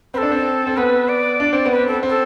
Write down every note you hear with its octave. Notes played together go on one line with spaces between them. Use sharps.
C4 B4
D4 A4
C4
C4
B3 B4
D5
D4
C4
B3
B4
C4
A4
C4
A4